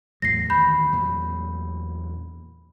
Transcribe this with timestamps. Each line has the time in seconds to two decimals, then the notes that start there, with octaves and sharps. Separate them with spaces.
0.22 E2 A2 F#3 A#6 C7
0.50 D2 D#3 E3 B5 G6
0.92 E2 A#2 F#3